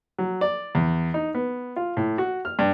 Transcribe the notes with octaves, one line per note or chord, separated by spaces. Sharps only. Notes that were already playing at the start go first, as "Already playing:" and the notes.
F#3
D5
E2
D#4
B3
F4
A2
F#4
F6
G2